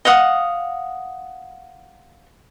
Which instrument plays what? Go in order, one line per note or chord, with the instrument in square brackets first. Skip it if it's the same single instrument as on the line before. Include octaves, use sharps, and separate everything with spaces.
[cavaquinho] D#5 F5 F#5 D#6